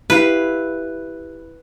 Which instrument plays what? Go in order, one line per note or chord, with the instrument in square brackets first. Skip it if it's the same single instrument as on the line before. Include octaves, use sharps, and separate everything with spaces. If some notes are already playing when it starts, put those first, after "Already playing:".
[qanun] E4 G4 F5 [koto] B4